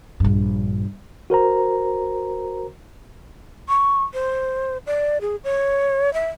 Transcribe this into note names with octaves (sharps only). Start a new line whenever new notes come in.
A#1 G2
F#4 A#4 C5 A#5
C#6
C5
D5
G#4
C#5
E5